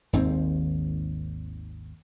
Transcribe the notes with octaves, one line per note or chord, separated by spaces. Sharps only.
G#1 D#2 G#2 C4